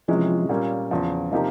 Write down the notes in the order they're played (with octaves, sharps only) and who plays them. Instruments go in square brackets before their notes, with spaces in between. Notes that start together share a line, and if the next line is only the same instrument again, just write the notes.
[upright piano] C3 E3 G#3 C#4 [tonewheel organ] F3
[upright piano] A#2 G3 A#3 C#4
E2 C#3 F3
C3 F3 A#3 D#4 G4